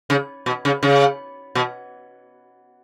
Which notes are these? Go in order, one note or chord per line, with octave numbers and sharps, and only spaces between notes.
C#3
B2
C#3
C#3
B2